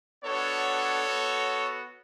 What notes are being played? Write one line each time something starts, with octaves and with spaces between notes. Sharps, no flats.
B3 D4 F#4 A4 C#5
B3 F#4